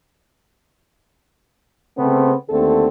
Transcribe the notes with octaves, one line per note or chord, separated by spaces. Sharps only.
C#3 A3 B3 C4
D#2 D3 A3 C4 A4